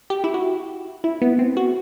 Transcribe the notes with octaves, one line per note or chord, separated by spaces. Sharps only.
G4
E4
F#4
E4
B3
C4
F#4